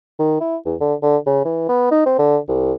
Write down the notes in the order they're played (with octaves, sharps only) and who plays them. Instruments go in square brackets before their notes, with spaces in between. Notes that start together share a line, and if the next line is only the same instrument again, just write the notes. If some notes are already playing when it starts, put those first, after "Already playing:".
[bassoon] D#3
E4
E2
D3
D3
C#3
E3
B3
D#4
C4
D3
C2